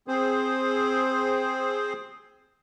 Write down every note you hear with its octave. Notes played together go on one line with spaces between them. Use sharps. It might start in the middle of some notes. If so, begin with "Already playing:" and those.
C4 G#4 C5